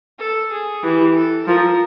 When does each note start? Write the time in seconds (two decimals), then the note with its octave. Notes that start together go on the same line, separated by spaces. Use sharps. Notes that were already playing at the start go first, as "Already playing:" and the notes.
0.19 A4
0.52 G#4
0.83 E3 G4
1.14 A4
1.47 F3 A#4